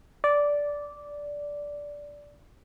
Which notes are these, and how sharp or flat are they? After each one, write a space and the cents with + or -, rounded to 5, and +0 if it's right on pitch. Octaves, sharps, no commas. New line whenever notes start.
D5 -10